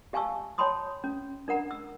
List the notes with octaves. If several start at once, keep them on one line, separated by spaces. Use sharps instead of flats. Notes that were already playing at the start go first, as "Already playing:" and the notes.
G4 F5 G#5 A5 C#6 E6
C#5 G5 A5 B5 C6 D#6
C#4
D4 A#4 F#5 A#5
E6